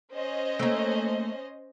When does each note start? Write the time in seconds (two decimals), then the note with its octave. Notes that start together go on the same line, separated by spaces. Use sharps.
0.13 C#4 C5 D#5
0.59 A3 A#3